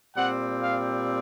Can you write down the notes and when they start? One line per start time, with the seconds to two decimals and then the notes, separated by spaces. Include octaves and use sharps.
0.15 A#2 G3 C4 F#5
0.62 F5